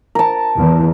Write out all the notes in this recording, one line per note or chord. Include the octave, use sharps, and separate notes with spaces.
A#4 A5
E2